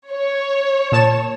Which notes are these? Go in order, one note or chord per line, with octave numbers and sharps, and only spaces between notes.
C#5
A#2 A5 E7